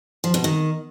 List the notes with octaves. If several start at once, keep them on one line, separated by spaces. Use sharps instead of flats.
F3
B2
D#3